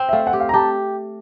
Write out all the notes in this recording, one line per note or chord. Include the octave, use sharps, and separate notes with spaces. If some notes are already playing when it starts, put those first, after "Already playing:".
Already playing: C4
E5
A3 F5
F#5
G4
F5
A#5
G4 A5